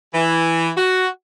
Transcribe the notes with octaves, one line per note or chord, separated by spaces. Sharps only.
E3
F#4